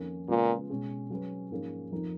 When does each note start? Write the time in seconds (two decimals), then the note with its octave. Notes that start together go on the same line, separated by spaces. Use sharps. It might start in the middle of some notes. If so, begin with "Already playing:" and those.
Already playing: F2 D#3 A#3 C#4
0.29 A#2 C#3 G#3 B3 F4 B4
0.70 B2 G#3 C#4 G#4
1.10 F#3 C#4 G#4 B4
1.51 G#2 F3 A#3 C#4 G#4
1.92 F2 F3 A#3 D#4 A#4